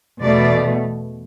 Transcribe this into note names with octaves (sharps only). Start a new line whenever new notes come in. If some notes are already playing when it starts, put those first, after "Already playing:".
E2 B2 A3 D5